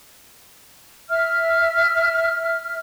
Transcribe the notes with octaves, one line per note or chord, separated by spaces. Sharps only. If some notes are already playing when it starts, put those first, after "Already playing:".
E5 F6